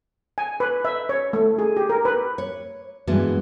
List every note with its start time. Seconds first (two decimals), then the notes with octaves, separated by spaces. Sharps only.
0.38 G#5
0.60 B4
0.85 E5
1.09 C#5
1.33 A3
1.59 G#4
1.77 G4
1.89 A#4
2.05 B4
2.38 C#5
3.07 G2 E3 G#3 B3 D4 F#4